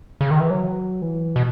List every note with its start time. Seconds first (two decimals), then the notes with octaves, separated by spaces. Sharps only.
0.21 C#3
0.31 D#3
0.40 E3
0.50 F#3
1.02 E3
1.36 B2